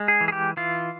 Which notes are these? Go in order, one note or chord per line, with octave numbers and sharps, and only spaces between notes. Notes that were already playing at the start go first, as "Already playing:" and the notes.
Already playing: G#3
G#4
E3
G#4
G4
E3 F4